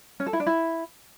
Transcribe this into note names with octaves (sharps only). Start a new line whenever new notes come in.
C#4
A4
E4
D4
E4